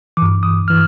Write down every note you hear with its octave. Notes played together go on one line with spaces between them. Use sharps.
G2 E3 D6
D#6
E3 F6